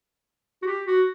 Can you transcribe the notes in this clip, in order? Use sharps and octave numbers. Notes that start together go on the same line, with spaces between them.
F#4
G4
F#4